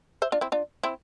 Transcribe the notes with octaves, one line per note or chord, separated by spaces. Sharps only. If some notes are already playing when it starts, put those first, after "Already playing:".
C5 E5
D4 F4
C4 E4
D4 F4
C4 E4